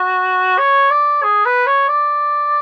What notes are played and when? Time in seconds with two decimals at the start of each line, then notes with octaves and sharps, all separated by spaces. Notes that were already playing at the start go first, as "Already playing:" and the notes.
Already playing: F#4
0.58 C#5
0.91 D5
1.23 G#4
1.45 B4
1.67 C#5
1.88 D5